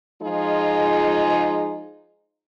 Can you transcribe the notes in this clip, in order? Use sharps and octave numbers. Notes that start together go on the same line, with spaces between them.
F3 G#3 D#4 F4 G#4